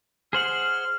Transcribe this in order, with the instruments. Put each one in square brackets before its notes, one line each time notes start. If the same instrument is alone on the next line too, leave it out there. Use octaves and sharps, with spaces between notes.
[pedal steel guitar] G#4 C5 F#5 [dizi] F6